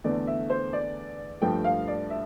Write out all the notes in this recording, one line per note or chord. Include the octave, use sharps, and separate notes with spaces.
E2 D3 A3 D5
E5
C5
D5
G2 F3 A3 G5
F5
D5
E5